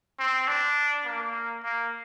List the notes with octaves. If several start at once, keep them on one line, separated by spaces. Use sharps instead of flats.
C4
D4
A#3
A#3